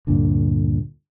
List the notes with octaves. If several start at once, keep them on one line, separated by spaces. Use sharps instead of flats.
D2 G2 A#2 D3